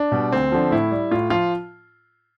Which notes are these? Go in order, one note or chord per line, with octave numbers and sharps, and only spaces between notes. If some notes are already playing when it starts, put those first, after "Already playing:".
Already playing: D4
B2 G3
D2 C4
D3 F3
A2 E4
G3
A2 F4
F3 F4